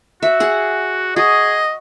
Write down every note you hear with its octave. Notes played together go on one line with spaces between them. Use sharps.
F#4 E5
G#4 F#5
F#4 G#4 D#5